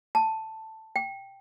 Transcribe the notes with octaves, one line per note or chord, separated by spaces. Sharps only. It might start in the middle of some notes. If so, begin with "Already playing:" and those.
A5
G5